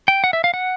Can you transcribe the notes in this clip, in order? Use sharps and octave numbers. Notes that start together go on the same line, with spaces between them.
G5
F#5
E5
F5
F#5